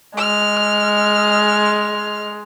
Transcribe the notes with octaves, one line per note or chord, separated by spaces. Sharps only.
G#3 F6